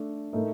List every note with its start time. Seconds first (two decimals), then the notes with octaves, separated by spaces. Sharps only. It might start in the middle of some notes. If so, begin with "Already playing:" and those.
Already playing: A3 D4 A4
0.33 A2 A3 D#4 A#4